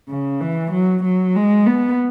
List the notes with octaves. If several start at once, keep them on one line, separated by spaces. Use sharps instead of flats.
C#3
E3
F#3
F#3
G#3
B3